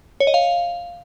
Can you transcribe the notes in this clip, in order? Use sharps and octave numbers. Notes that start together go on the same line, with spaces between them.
C#5
D#5
F5